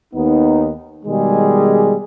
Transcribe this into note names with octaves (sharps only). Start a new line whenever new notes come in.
D#2 B3 D#4
B2 D#3 G3 G#3 G#4